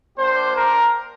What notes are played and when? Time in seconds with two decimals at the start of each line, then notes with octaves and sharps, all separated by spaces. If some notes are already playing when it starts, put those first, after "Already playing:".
0.18 A#3 D4 G4 C5
0.56 A#4